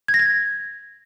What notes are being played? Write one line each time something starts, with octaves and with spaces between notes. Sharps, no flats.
G#6
A#6
G#6